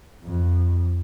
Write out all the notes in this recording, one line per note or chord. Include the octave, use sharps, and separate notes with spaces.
F2